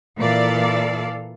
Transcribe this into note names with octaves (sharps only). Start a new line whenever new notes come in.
A#2 E3 A4 D5 F5